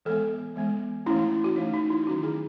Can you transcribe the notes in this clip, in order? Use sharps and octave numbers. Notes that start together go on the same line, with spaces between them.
E3 G#3 B3 A4
E3 G#3 B3
E3 A3 C#4 E4
E4
F#4
E3 A3 C#4 D#4
D#4
E4
D#3 F#3 C#4 F#4
G#4